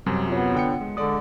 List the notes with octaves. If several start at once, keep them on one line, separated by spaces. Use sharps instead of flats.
F#2 C3 F#3 G3
B3 F4 C#5
D3 G5 C#7
G#3
D3 G#3 D5 D#6